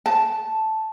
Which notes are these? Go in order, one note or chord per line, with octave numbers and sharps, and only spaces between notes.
A5